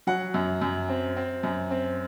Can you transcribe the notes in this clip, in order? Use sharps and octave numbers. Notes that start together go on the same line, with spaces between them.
F#3 F#5
F#2
F#2
C4
C4
F#2
C4